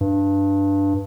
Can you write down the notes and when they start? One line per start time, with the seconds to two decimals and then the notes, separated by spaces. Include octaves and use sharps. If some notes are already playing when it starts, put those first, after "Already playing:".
0.01 G2